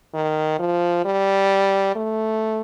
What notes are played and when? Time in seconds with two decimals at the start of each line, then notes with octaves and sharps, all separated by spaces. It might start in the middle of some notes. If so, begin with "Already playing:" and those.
0.14 D#3
0.59 F3
1.05 G3
1.96 A3